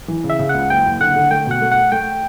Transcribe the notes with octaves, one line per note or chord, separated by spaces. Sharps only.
E3
C#3
E5
C#3
F#5
C#2
F#1 G5
F#1
D3 F#5
D3
A3 G5
B2 F#5
A3
F#5
A3
A3 G5